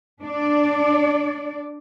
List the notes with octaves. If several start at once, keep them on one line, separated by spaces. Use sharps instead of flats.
D4 D5